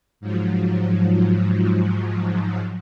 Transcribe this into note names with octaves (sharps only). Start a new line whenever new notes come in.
G#2 F3 F#3